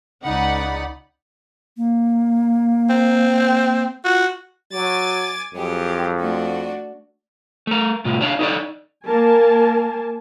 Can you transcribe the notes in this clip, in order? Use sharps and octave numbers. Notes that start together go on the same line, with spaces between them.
C#2 C#3 D#4 D5 F#5 B5
A#3
C4
F4 F#4
F#3 G#5 D6 A6
F2 F#3 G4 G#4
A3 D4 F#4
A3 A#4
A2 C3 F4
D4 C#5 D5 F5
D#4 A4 B4 C#5 D5
A#3 A#4 G#5 A5